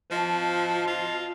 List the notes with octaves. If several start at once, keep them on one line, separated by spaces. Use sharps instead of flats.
F3 D#5 A5
F4